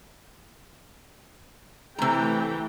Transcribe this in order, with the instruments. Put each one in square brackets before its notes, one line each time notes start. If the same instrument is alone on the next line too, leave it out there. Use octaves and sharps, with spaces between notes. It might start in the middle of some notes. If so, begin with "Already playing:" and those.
[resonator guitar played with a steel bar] C3 A#5 [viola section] E3 A3 G5